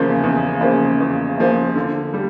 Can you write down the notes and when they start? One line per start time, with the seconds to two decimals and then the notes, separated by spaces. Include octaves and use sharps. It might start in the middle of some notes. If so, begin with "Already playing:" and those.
Already playing: E2 C#3 F3 A#3
0.24 E2
0.61 C#3 F3 A#3
1.00 E2
1.37 C#3 F3 A#3
1.76 D3
2.14 G3